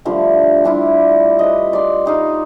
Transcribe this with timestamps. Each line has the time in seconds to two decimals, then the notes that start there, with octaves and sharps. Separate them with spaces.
0.05 D3 F3 G3 A3
0.64 G3 D4 E4 F4
1.39 B4 D#5
1.73 D5 C6
2.05 G3 D#4 F5